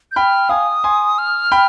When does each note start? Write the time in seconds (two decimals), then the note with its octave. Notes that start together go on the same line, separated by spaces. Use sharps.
0.12 G6
0.16 G5 B5 F6
0.49 F5 G#5 D#6
0.84 G#5 C6
1.18 F6
1.52 G5 B5